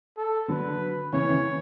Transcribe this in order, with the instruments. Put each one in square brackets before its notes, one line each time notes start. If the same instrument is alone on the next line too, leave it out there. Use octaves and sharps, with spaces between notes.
[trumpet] A4
[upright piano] D3 F#3 [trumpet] B4
[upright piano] C#3 E3 [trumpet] C#5
[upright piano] C#3 E3